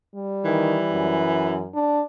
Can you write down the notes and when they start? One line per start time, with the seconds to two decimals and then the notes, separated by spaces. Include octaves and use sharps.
0.15 G3
0.45 D#3 E3
0.92 F#2
1.74 D4